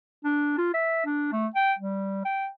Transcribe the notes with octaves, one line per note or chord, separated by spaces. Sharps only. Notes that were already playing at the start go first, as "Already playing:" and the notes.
D4
F4
E5
D4
A3
G5
G3
G5